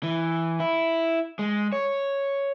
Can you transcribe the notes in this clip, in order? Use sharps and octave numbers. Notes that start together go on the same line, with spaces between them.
E3
E4
G#3
C#5